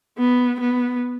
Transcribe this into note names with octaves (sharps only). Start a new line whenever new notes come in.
B3
B3